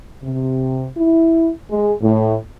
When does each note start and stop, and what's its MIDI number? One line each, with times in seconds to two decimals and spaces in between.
0.22 0.88 48
0.96 1.50 64
1.70 1.92 56
2.01 2.35 45